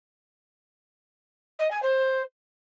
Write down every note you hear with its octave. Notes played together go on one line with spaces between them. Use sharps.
D#5
G#5
C5